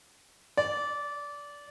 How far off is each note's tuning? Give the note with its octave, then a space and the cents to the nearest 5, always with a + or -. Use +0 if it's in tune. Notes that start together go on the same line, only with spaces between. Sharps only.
D5 -20